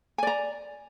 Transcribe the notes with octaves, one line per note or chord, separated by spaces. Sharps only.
D5 G#5 A#5